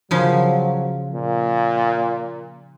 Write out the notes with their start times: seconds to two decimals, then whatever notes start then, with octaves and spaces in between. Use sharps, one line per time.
0.11 C#3 F3 F#3
1.14 A#2